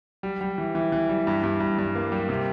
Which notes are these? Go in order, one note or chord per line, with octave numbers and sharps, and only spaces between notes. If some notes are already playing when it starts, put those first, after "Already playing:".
G3
G3
E3
E3
E3
G3
G2
G2
G2
G2
A#3
G3
C3